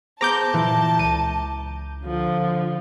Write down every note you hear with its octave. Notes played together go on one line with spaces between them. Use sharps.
B3 G#4 C5 A5 A#5 D6 G6
A#2 E3
C#2 D#7
D3 F3